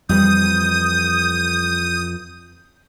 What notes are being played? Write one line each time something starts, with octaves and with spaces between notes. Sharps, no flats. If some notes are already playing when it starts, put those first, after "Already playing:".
F2 E3 G3 D#6 G6